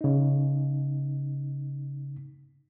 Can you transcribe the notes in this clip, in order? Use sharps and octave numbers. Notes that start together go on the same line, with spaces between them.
C#3 D#4